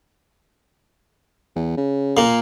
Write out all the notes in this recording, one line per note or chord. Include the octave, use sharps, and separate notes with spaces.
E2
C#3
A#2 A#3